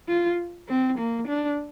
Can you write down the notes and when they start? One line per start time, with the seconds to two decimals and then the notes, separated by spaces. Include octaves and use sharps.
0.08 F4
0.69 C4
0.99 A#3
1.28 D4